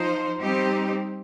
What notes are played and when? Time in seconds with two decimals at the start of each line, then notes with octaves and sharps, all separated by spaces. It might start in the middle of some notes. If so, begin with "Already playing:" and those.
Already playing: F3 D#4 C5
0.40 G3 C4 D#4 G4